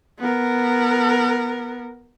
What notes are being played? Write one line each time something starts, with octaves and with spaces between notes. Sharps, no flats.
B3 A#4